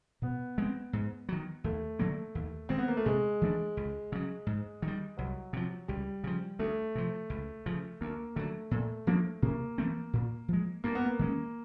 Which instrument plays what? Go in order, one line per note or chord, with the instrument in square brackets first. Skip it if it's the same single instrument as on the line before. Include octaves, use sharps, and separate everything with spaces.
[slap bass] B2 [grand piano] B3
[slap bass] G#3 C4
G#2
D#3 F#3
[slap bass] D#2 [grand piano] A3
[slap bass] D3 F#3 A#3
D#2
[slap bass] D#3 G#3 [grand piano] C4
[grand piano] B3
A#3
A3
[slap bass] C3 [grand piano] G#3
[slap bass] E3 A3 D4
C#2
C#3 F#3
G#2
D#3
G3
[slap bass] C2 [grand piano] F#3
[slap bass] C3 F3
[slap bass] C#2 [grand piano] G3
[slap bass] C#3 F3
[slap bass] D2 [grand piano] A3
[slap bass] C3 F3
C#2
C#3 F3
[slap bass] D2 [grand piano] A#3
[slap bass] D3 F#3 [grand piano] A3
[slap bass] A#2 [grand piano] A3
[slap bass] F3 A#3 D4
[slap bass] C3 [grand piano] A#3
[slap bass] E3 A3 C4
A#2
F3 G#3
[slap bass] G2 [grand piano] A#3
[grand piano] B3
A#3
[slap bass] D#3 G#3 C#4